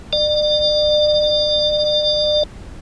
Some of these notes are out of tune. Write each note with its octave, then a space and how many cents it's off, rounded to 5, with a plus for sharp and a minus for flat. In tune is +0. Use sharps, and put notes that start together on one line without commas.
D5 +40